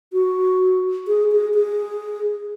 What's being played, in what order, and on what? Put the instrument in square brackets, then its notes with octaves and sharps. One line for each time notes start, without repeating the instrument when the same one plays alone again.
[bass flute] F#4
G#4
G#4
G#4